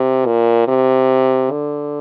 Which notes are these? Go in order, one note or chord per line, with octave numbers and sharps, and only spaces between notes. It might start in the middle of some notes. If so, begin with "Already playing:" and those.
Already playing: C3
A#2
C3
D3